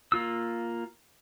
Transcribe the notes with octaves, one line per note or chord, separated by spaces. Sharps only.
A#3 F4 E6